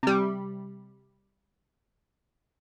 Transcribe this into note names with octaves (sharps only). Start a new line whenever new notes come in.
C3 G3